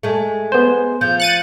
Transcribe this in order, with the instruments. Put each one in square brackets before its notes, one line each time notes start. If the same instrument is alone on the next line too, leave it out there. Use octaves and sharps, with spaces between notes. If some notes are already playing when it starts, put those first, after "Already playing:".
[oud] G#3 A3
[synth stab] B3 C5
[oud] F3 [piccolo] G6
[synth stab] F#6 A6 D#7 [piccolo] C#7